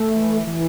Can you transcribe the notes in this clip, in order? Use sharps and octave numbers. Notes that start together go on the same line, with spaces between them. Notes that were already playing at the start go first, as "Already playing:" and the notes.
Already playing: A3
E3
E3